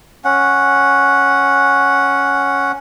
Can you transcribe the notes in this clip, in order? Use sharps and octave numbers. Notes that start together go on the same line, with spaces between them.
C#4 F#5